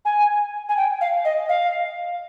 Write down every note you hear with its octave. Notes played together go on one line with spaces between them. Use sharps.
G#5
G#5
G5
F5
D#5
F5